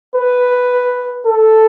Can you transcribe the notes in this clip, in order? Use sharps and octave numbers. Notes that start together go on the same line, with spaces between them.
B4
A4